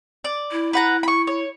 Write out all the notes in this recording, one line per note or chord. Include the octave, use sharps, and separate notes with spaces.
D5
E4
B4 F#5 A#5
B5 C#6
C#5